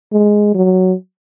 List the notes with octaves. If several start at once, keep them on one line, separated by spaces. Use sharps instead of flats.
G#3
F#3